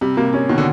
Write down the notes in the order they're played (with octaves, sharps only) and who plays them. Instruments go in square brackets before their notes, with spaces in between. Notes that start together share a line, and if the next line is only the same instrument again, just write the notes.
[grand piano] C3 [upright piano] G3
[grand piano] C3 [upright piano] A#3
[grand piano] C3 [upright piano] C#4
[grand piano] B2 [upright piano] D#3
[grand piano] D3